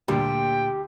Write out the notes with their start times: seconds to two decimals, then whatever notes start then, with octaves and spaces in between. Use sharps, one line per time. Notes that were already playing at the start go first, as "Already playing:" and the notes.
0.08 D2 A#2 G3 G4 G5